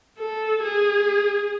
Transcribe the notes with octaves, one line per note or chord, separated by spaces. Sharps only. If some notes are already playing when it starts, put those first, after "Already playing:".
A4
G#4